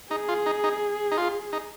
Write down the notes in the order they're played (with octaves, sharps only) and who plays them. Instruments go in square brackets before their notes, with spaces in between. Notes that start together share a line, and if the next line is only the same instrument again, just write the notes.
[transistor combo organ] D#4 [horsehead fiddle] G#4
[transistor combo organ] F4
D#4
D#4
D#4
F4
D#4